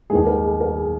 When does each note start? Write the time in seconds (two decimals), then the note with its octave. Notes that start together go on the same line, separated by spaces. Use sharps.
0.10 D#2 D#3 G#3 G#4
0.26 A#4
0.44 G#4
0.61 A#4
0.77 G#4